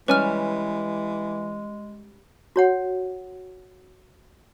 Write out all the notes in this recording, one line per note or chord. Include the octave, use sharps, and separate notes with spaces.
E3 G3 G#3 C#4 B4 G#5 F6
F#4 C#5 F#5